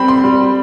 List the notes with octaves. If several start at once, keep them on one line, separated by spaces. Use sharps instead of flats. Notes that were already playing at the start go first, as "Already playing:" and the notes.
Already playing: G3 C4 B5
C6
G3